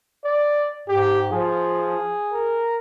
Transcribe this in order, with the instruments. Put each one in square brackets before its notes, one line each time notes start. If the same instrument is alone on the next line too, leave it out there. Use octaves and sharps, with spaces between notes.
[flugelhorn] D5
[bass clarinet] G#2 [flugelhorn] G4
[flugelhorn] F3 [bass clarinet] G#4
[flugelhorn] A#4